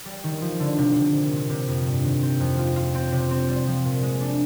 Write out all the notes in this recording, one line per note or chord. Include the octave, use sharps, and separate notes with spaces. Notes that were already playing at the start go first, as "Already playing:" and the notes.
G3
D#3
F3
D3
C3
C3
A#2
A#2
C3
F2
G2
D#3
C4
F2
F4
F4
C4
C3
C4
G3
F3
A#2
G#3
D4